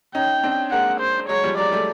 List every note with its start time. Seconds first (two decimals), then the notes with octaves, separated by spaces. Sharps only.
0.15 C#4 D#4 G5
0.43 C4 D4
0.71 G#3 A#3 F#5
1.00 C5
1.29 F#3 G#3 C#5
1.44 F3 G3
1.57 F#3 G#3 D5
1.72 G3 A3